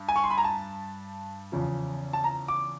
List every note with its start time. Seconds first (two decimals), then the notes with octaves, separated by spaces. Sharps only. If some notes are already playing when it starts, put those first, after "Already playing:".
Already playing: G2
0.09 G#5
0.16 C#6
0.24 C6
0.30 B5
0.38 A#5
0.44 A5
1.52 E2 C#3 F3
2.13 A5
2.24 A#5
2.48 D6